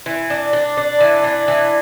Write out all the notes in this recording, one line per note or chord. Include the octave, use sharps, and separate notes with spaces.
E3
D4
D4
D4
E3
D4
E3